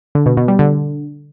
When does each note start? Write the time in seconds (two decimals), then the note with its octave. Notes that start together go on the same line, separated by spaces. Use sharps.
0.15 D3
0.26 B2
0.37 B2
0.48 G3
0.59 D3